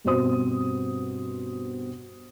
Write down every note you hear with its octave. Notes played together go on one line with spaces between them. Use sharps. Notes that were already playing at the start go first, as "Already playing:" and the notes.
G2 B2 C4 F#4 C5 D#6